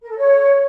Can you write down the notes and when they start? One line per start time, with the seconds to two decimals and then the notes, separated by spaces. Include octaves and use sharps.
0.03 A#4
0.10 A4
0.17 C#5